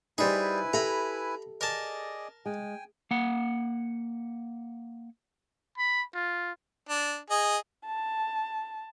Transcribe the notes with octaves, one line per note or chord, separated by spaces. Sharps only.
G3 D#4 E4 G#4 B4 C5 G#5
G4 A4 E5 A#5 B5
G#4 A#4 D5 D#5 A5
G#3 G5 G#5
A#3 F#5
B5
F4
D4
G#4 D#5
A5